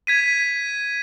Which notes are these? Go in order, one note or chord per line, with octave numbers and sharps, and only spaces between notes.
G#6 B6 D#7